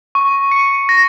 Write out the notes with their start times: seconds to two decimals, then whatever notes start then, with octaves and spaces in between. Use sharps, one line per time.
0.15 C#6
0.51 C#7
0.89 A#6